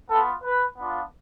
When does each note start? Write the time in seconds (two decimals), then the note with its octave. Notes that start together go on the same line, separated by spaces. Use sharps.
0.10 B3 F4 A4
0.43 B4
0.78 B3 D4 F4